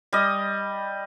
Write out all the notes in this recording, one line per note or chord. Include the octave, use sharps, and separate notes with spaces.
G3 D#5